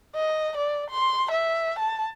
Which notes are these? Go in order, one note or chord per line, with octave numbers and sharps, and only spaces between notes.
D#5
D5
C6
E5
A5